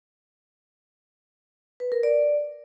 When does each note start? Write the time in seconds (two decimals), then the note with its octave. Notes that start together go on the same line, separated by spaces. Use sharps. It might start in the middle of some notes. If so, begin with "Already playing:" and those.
1.80 B4
1.92 A#4
2.03 D5